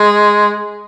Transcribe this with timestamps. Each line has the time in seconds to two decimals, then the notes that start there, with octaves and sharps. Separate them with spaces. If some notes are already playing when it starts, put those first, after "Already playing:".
Already playing: G#3